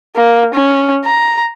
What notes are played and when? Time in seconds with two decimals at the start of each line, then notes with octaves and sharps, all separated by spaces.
0.15 A#3
0.54 C#4
1.05 A#5